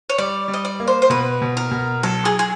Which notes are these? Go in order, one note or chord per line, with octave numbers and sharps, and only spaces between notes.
C#5
G3 D5
G3
D#5
D5
A#3
C5
C5
B2 B4
B2
A#4
B2
F#3 A4
G#4
G#4